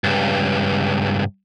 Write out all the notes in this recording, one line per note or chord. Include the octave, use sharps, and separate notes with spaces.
C#2 G2